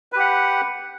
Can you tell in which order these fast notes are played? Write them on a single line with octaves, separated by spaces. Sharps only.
B4 G4 F#5